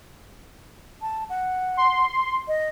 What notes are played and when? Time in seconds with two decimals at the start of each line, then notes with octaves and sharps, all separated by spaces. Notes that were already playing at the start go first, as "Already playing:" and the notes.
1.02 A5
1.30 F#5
1.77 C6
2.48 D#5